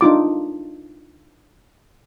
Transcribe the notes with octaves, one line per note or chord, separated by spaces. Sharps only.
D4 D#4 F4 D6